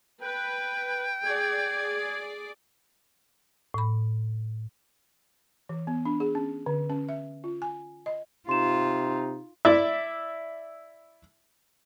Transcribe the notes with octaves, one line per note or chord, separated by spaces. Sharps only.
B4 G5
G#4 D5 G#6
A2 B5
E3
B3
D4
G#4
C#4
D3
C#4
E5
F4
G#5
D#5
C3 D#4 F4 C6 E7
E4 D5 E5